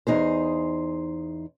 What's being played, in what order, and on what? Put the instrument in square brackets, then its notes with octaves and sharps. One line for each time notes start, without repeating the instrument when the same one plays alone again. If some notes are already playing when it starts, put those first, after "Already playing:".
[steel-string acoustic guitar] E2 D#4 G#4 C5